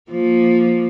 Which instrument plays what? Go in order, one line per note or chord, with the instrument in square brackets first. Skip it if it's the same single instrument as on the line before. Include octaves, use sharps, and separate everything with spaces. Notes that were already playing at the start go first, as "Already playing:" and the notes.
[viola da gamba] F3 A#3